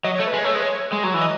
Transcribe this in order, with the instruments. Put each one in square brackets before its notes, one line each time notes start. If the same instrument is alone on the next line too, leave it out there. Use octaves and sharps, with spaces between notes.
[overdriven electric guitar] F#3 [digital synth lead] D#5
[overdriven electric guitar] A3 [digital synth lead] C#5
[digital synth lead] B4
[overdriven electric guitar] G#3
[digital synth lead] C#5
[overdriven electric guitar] A3
[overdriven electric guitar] G#3 [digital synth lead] B4
[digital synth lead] C#5
[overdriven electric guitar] G#3
F#3
E3
[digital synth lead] D#5